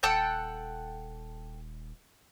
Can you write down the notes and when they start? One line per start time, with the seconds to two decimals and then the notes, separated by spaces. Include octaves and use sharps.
0.03 D#1 A4 F#5 G5